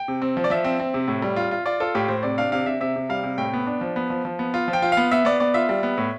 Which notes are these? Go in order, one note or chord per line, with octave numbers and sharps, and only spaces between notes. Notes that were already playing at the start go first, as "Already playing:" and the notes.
Already playing: G5
C3
C4
F3
D5
F3 E5
C4
C4
C3
A2
G3
F4
F4
F4 D5
F4 A4
A2 G4
A2 C5
C3 D5
D4 F5
C3 F5
C3 E5
C3 E5
C3
G3 F5
C3
A2 G5
B3
D4
F3
B3
F3
F3
B3
F4
F3
G5
F4
B3 F5
B3 E5
B3 D5
B3 D5
F4 E5
G3
B3
A2